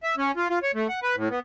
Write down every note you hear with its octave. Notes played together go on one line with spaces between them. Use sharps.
E5
C#4
F4
F4
C#5
A3
F#5
B4
A2
B3